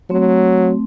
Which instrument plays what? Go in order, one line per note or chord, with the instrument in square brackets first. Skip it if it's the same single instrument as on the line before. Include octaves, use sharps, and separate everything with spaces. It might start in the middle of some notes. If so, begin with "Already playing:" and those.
[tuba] F#3 [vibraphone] A3 C4